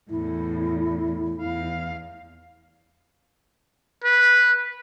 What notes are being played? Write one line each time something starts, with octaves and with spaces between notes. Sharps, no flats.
E2 A2 E4
E2 F5
B4